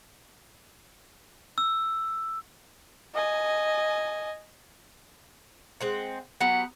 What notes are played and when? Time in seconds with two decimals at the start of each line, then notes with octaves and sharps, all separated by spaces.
1.58 E6
3.14 D#5 G#5
5.81 G#3 C4 F#5
6.40 F#3 B3 G4 F#5